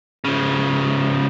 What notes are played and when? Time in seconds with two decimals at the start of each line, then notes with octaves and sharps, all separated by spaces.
0.24 C#3 F3